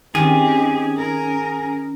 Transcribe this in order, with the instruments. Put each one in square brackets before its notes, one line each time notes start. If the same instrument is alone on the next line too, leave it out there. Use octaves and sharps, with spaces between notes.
[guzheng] D#3 [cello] C4 G4 [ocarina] C#4 [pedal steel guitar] G#4
[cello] A#4